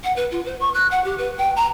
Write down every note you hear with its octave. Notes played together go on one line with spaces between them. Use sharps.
F#5
B4
F4
C5
C#6
F#6
F#5
G4
B4
G5
A#5